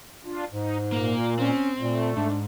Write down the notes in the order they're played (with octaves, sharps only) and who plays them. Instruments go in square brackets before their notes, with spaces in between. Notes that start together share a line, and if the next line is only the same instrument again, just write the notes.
[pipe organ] D4 F4
[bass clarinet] G#2 [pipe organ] D#4
[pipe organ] A#2 [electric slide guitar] A#3 A#4
[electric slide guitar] C4 [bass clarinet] C#4
[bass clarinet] A#2 [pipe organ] A3
[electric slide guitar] G#2 [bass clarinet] D4